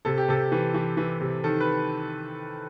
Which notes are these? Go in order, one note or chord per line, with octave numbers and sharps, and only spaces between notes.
C3 A4
G4
C3 A4
E3
E3
E3
C3
D#3 A4
B4